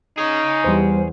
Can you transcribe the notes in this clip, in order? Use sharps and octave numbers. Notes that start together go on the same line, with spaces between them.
D#4 G#4 C#5
E2 G3 C5